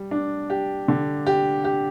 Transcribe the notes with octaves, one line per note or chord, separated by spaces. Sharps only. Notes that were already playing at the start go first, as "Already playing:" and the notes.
Already playing: G3
D4
G4
D3
G4
G4